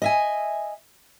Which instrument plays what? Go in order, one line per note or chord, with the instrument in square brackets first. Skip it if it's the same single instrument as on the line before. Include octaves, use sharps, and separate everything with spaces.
[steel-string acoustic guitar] D#5 E5 G#5